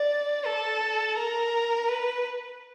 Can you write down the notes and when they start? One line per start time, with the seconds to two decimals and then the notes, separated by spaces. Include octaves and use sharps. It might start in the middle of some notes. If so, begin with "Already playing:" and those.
Already playing: D5
0.46 A4
1.18 A#4
1.88 B4